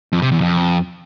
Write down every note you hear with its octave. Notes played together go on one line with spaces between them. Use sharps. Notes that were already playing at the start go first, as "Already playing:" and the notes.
F2
C3
E2
F2